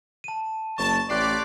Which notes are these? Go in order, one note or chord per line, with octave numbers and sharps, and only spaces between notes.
A5 D#7
F#1 A5 C#6
A1 G4 D5 C6 F#6 C7